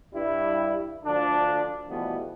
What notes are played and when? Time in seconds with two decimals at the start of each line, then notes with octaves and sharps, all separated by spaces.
0.14 G2 G3 E4
1.05 D2 D3 F3 D4
1.89 B2 E3 F3 G3 A3 B3